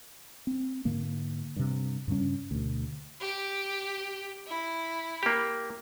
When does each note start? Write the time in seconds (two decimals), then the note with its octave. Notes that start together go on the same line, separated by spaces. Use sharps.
0.47 C4
0.85 G#2 D3 A#3
1.56 G2 C3
2.08 G2 C#3 G3 C#4
2.51 D2 B2
3.21 G4
4.47 E4
5.23 A#3 G4